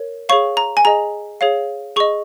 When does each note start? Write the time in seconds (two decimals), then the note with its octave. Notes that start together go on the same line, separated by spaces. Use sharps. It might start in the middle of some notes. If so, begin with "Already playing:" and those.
Already playing: A#4 C#5
0.29 G#4 C#5 F5 C#6
0.57 A#5
0.77 G#5
0.85 G#4 D#5 A#5
1.41 G#4 C#5 F5
1.96 G#4 D#5 C#6